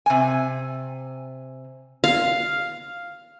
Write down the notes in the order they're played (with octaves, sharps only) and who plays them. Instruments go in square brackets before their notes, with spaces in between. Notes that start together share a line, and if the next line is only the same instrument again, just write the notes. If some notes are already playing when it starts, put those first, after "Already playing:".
[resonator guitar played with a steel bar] C3 G#5
[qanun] F5